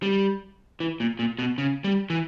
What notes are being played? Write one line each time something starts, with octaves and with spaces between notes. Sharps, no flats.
G3
E3
A#2
A#2
B2
C#3
G3
E3